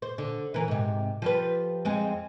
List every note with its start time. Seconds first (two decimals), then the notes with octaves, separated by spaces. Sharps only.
0.02 C5
0.18 D3
0.54 E3 A#4
0.68 G#2 C3
1.22 F3 G3 B4
1.85 F2 G#3 C4